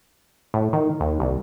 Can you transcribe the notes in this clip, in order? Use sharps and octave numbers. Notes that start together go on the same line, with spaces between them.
A2
D#3
D#2
C2